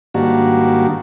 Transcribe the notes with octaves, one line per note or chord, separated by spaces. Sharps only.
G#2 D#3 G3 A#3 D4 F#4